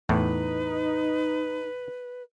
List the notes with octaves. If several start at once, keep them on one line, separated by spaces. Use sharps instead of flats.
E2 A2 D#4 B4